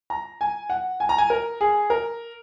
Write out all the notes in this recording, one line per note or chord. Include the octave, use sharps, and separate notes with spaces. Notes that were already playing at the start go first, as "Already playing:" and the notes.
A#5
G#5
F#5
G#5
A#5
G#5
A#4
G#4
A#4